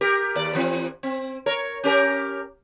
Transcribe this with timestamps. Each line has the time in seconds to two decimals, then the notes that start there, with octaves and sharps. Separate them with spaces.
0.01 G4 A#4
0.36 D#2 D5
0.55 E3 C4
1.03 C4
1.46 A#4 C#5
1.84 C#4 G4 A#4